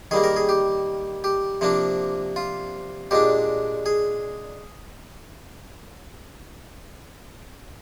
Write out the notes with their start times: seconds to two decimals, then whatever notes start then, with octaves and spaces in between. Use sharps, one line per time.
0.11 D#3 G3 A#3 G#4
0.24 A#4
0.36 G#4
0.49 G4
1.24 G4
1.61 C3 F3 A#3 D4
2.36 F4
3.11 A#2 G#3 D4 G4
3.86 G#4